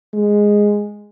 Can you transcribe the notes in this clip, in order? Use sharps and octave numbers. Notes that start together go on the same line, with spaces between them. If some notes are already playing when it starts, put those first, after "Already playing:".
G#3